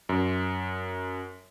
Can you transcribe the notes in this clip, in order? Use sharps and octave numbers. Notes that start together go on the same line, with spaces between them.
F#2